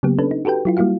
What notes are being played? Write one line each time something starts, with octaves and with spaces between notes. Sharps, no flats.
C#3 F#3 A#3 B3 G4
C#4 D4 A4 B4
D#4
F#4 G4 A4 B4 G5
F#3 E4 F4
G3 A#3 E4 F#4 F5